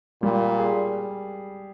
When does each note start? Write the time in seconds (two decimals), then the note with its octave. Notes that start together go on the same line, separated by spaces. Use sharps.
0.23 A#2 G3
0.58 G#4